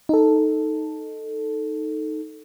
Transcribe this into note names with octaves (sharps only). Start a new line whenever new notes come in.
D#4 A4